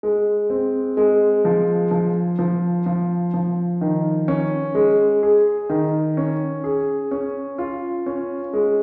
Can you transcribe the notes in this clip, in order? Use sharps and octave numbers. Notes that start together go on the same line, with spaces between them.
G#3
C4
G#3
F3
F3
F3
F3
F3
D#3
C#4
G#3
G#4
D#3
C#4
G#4
C#4
F4
C#4
G#3